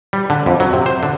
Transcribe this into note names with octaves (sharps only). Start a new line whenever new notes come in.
G3
D3
F2
F#3
C3
C5
D3